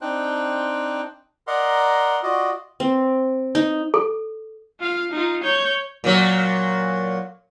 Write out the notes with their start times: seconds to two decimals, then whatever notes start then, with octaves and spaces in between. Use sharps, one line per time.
0.01 C4 D4 D#4 C5 G5 F#6
1.47 A#4 D5 D#5 F#5 A#5 C6
2.23 F4 F#4 D5 D#5
2.80 C4
3.55 D#4
3.94 A4
4.80 F4 F5
5.12 D#4 F4
5.44 C#5 G6
6.04 A#2 F#3